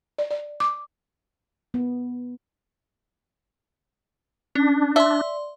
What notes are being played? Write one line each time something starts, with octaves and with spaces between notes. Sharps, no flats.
D5
D5
D6
B3
C#4 D4
D5 E5 C6